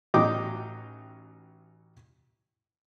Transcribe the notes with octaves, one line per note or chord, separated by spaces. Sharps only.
A1 F#3 D#4 G5 D6 D#6